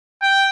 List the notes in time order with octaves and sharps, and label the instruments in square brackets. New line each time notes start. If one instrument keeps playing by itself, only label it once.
[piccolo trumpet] G5